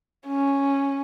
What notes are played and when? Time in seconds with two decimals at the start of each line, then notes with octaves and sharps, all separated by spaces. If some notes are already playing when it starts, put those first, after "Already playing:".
0.27 C#4